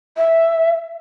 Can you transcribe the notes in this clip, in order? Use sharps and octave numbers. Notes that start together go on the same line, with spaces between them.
E5